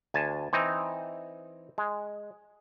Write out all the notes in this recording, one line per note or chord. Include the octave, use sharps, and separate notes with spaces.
D2 G#5 A5
E3 C4 D#4
G#3